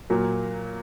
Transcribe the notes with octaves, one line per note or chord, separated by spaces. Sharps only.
A#2 F#3 A#3